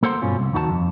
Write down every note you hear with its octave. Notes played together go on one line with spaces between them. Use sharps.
A#3 A4 C5 F#5 C6
G2 B2 C#4 F4
C2
D#2 D#3 F#4 B4 A5
F2